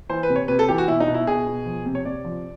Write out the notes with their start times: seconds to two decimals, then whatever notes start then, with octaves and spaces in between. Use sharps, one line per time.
0.09 E3 C5
0.23 B4
0.29 C3
0.36 C#5
0.48 C3 B4
0.59 A4
0.68 E3 G4
0.78 F#4
0.88 B2 E4
1.00 D#4
1.07 B2
1.14 E4
1.27 B2 G#4
1.46 B2
1.66 F3
1.86 C3
1.95 C#5
2.05 C3 D5
2.25 F3